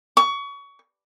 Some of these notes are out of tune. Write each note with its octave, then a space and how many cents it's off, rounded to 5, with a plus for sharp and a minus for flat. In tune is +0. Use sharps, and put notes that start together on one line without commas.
C#6 +25